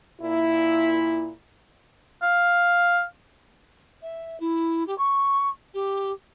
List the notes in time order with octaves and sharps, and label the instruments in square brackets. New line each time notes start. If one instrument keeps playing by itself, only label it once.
[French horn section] A#2 E4
[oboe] F5
[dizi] E5
E4
G4
C#6
G4